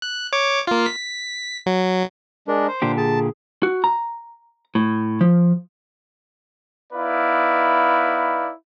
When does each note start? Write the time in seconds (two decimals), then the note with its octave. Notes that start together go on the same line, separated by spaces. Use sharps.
0.02 F#6
0.33 C#5 D6
0.67 A#3 F4
0.86 B6
1.66 F#3
2.48 G#3 D4 A#4
2.68 C5
2.82 A#2 D3 D4 G4
2.97 G#4 A5
3.63 F#4
3.84 A#5
4.75 A2
5.21 F3
6.93 B3 D#4 E4 B4 D5 F5